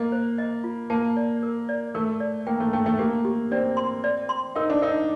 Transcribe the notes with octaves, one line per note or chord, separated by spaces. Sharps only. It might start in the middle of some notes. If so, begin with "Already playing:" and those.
Already playing: A#3 D#5
C5
D#5
F4
A#3 A5
D5
A#4
D5
A3 A#4
D5
A#3 G5
A3
A3 G5
A3
A#3 G4
G4
C4 D5
C6
D5
C6
D#4 A#4
D4
D#4 A#4